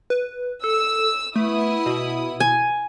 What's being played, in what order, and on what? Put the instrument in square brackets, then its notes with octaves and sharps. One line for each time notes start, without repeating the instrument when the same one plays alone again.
[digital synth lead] B4
[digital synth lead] A4 [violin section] E6
[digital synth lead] A3 [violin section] B3 E4 D#6
[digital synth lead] B2
[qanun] G#5